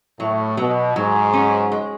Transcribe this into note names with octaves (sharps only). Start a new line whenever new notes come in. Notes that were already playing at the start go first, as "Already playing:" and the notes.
A2 F#3
B2 F#3
G#2 F#3
C#4
G#3